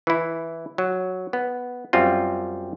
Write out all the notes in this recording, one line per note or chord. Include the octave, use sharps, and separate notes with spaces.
E3 E4
F#3
B3
F#2 G3 C4 F4